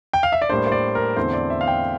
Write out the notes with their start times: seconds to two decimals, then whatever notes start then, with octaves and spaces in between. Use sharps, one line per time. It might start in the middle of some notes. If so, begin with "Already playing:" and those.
0.13 G5
0.23 F5
0.32 E5
0.42 D5
0.49 A2 G3 A#3 D4 C5
0.67 C5
0.72 D5
0.95 A#4
1.17 E2 D3 A3 C4 E4 C5
1.33 D5
1.50 E5
1.61 F5
1.67 G5